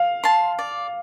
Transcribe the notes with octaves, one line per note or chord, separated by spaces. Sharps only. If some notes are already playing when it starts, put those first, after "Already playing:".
Already playing: F5
A5 C6
D5